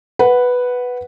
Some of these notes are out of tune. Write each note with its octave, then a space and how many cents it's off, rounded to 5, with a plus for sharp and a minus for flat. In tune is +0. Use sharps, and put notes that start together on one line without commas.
B4 +0 F#5 +0